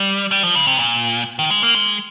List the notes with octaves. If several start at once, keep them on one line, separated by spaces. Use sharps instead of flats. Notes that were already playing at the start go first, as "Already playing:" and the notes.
Already playing: G3
G3
F3
C#3
C3
A#2
D#3
G#3
A#3
G#3